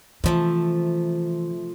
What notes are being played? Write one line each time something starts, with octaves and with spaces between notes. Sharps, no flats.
C3 E3 F3 A3